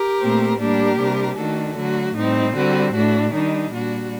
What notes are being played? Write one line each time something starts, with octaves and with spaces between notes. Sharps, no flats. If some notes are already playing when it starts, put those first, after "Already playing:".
Already playing: G4 A#4
A#2 A3 C4
A2 G3 A#3 D4 G4 A#4
C3 G3 D4
D#3 A3 D4 F#4 A4
D3 F#3 A3 F#4
A2 G3 C4 D#4
D3 G3 C4 F#4
A2 A3 D4 F#4
D#3 G3 D4 D#4
A#2 G3 D4 F#4